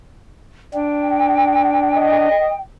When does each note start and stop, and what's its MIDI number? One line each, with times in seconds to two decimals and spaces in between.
0.74 2.28 62
0.74 2.58 79
1.96 2.51 75